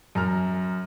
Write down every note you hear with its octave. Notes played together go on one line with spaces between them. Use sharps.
F#2 A#5 F6